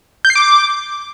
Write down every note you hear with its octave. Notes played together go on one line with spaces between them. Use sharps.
G6
C7
D6